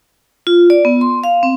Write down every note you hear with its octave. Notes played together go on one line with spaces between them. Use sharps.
F4
D5
B3
C6
F5
C4